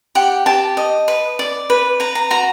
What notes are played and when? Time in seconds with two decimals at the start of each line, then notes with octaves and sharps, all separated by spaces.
0.15 G4 F#5
0.46 G4 A5
0.77 D#5
1.08 B4
1.39 D5
1.70 B4
2.00 B4 A#5
2.15 A#5
2.30 F#4 A#5